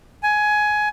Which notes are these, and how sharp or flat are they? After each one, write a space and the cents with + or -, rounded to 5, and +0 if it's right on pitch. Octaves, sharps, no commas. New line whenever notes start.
G#5 +15